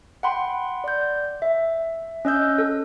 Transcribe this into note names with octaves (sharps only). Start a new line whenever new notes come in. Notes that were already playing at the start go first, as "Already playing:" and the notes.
F#5 G5 B5 C6
D5 G6
E5
C#4 D#5 E6 G6
A4